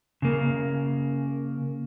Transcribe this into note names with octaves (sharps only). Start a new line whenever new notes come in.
C#3 A#3